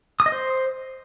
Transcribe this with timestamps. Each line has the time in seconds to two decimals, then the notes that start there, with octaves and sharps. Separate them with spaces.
0.20 D#6
0.26 D#5
0.32 C5